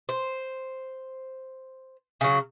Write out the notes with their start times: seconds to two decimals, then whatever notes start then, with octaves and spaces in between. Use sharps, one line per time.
0.09 C5
2.21 C#3 F#3